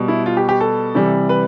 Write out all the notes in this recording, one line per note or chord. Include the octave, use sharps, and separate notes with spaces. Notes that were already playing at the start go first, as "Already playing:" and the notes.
Already playing: B2 G3
E4
F4
G4
G4
A4
C3 E3 G3
B4